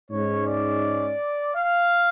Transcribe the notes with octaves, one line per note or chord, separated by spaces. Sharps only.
G#2 G#3 C#4 C#5
D5
F5